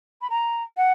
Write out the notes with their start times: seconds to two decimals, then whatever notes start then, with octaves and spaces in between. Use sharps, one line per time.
0.21 B5
0.29 A#5
0.76 F#5